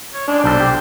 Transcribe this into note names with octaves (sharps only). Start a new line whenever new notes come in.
C#5
G#3 D4
B1 A4 C5
G4